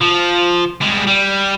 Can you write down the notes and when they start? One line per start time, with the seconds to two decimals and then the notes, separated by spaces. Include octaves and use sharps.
0.01 F3
0.81 G3 G#3
1.07 G3